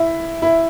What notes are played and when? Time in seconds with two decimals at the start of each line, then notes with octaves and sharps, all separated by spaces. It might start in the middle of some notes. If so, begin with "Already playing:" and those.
Already playing: E4
0.42 E4